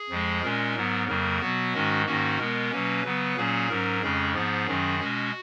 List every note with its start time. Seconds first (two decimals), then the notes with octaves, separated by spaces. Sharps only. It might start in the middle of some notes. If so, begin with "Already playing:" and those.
Already playing: G#4
0.10 F2 F3 G#3
0.43 A#2 G#3 C#4 A#4
0.75 G#2 F#3 B3
1.07 F2 C#3 F#3 A#3 A#4
1.40 B2 F#3 B3 F#4
1.73 G#2 D#3 G#3 C#4
2.06 G#2 D#3 A#3 C#4 F#4
2.38 B2 G#3 B3 A#4
2.71 B2 F#3 A#3 C#4 B4
3.04 C#3 F#3 B3
3.37 A#2 F#3 A#3 C#4 G#4
3.69 G#2 F#3 C#4 A#4
4.02 F2 C#3 G#3 C#4 G#4
4.34 G#2 F3 B3 G#4
4.67 F#2 D#3 F#3 C#4
4.99 B2 G#3 C#4 F#4